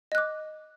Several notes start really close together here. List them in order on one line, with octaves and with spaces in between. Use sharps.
D#5 F#6 D6